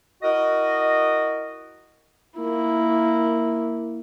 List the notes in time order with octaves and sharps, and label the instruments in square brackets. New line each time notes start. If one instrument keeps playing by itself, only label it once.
[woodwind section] E4 F#4 A#4 D#5
[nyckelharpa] A#3 E4